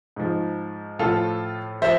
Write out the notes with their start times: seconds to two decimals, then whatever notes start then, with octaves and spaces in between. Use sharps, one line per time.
0.16 G#2 F3
0.99 A2 F3 F4 A4
1.82 F3 C5 E5